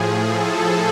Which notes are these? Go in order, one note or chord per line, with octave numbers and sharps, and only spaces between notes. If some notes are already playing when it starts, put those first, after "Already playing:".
Already playing: A2 F3 G#4
A4